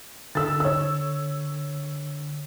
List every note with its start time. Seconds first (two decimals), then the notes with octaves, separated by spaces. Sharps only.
0.35 D3 E6 A6
0.60 C#5 E6